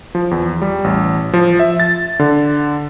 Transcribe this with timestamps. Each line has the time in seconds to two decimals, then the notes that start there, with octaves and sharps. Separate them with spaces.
0.15 F3
0.31 E2
0.62 G3
0.84 A1
1.33 F3
1.60 E5
1.80 A6
2.19 D3